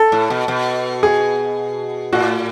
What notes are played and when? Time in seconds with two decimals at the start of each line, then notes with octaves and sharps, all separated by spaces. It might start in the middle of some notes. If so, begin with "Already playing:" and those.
Already playing: A4
0.12 A2
0.30 B2
0.48 B2
1.03 G#4
2.13 A2 F#4